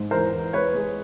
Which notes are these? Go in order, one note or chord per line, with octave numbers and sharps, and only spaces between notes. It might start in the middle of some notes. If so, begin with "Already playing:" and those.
Already playing: G#2
E2 A#4 C5
E2
G#3 B4 C#5
G#3